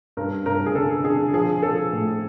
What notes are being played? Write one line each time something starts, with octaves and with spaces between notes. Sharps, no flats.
G2 A#4
G2 A#4
G#4
D3 A4
D3 G#4
F3 G#4
F3 A4
A2